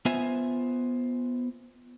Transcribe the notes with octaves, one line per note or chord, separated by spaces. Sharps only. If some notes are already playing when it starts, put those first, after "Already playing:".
B3 F4 C5 E5 G#5